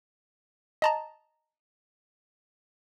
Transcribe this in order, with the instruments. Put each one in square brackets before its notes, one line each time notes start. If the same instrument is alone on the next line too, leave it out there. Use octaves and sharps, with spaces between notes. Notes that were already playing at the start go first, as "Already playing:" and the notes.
[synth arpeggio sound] D#5 A5 A#5